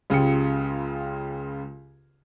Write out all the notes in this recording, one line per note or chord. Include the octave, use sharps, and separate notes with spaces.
C#2 C#3 F4 G4 C#7